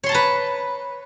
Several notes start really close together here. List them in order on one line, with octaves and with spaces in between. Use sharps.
C#5 C6 A5 A#5 B4